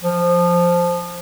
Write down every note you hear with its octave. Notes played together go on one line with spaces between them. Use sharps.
F3